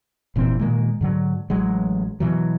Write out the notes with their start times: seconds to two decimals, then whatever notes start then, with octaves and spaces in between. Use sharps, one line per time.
0.36 E1 A#2 E3 C4
0.60 A#2 D#3 G#3 A#3
1.01 G#2 D3 F#3
1.50 A1 F#3 G#3
2.20 B2 E3 F#3